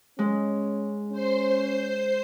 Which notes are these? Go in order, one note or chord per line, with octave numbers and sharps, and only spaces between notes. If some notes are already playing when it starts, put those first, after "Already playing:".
G#3 C#4
C#4 C5 C7